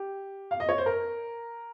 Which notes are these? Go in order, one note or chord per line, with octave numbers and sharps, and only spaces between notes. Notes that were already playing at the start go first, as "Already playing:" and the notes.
Already playing: G4
F5
D#5
C#5
C5
A#4